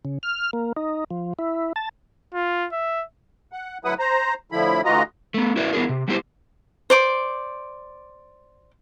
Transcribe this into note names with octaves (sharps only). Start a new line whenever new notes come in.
C#3
F6
A#3
D#4
F3
E4
A5
F4
E5
F#5
D2 F#3 E4 B4 F#5 D#6
C5 A#5
A2 D3 F3 E4 B5
D2 E3 F4 F#4 D#5 A#5
A3 B3
E4 F#4 B4 D5 E5
B3 E4 F4 G#4 A#4
C3
G3 B3 E4 G4 C5
C5 D5 D6